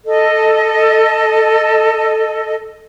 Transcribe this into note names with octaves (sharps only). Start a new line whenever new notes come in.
A4 D#5